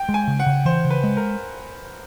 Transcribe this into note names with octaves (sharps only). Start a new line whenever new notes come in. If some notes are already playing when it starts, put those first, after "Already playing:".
Already playing: G5
G#3
G#5
C#3
F#5
C#3
E3 C5
C#3
B4
G#3
A#4